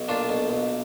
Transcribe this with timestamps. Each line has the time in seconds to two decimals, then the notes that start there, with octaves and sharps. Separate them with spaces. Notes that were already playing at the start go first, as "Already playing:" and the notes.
Already playing: B1
0.08 A#2 D4 F4
0.29 B1
0.49 B1